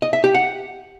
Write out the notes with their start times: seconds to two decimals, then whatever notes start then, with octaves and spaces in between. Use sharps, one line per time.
0.02 D#5
0.13 E5
0.24 G4
0.34 F#5